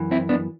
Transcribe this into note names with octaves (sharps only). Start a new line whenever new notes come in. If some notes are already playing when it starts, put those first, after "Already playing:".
Already playing: F#2 E3
C4 E4
B3 D4